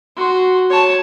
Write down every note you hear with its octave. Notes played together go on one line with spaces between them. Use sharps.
F#4 C6
C#5 A5